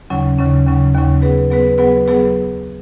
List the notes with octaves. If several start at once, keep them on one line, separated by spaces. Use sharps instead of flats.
D#2 C#3 F#3 C#4
D#2 C#3 F#3 C#4
D#2 C#3 F#3 C#4
D#2 C#3 F#3 C#4
F#3 B3 G#4 B4
F#3 B3 G#4 B4
F#3 B3 G#4 B4
F#3 B3 G#4 B4